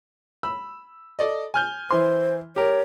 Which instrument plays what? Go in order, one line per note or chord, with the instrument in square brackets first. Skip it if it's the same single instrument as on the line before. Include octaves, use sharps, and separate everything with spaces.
[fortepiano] B5 [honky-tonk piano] E6
[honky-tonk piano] A4 D5 D#5
G#5 F6 G6
[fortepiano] E3 C6 [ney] C5
[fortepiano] G4 A#4 [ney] C#5